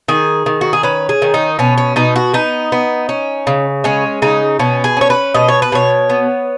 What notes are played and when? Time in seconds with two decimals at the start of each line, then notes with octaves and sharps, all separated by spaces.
0.08 D#3 G#4
0.46 D#3
0.61 F#4
0.73 G#4
0.83 C#4 B4
1.09 G#4
1.22 D#3
1.34 D#4
1.59 B2 C#4
1.78 C#4
1.96 B2 D#4
2.16 F#4
2.33 B3 D#4
2.72 B3
3.09 C#4
3.47 C#3
3.84 G#3 C#4
4.22 C#3 D#4
4.59 B2 C#4
4.84 G#4
4.97 C#4 C#5
5.10 B4
5.34 B2 D#5
5.48 C#5
5.62 B4
5.72 B2 C#5
6.09 B3